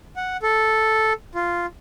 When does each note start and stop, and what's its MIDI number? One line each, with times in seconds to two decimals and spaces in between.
0.17 0.37 78
0.43 1.13 69
1.35 1.66 65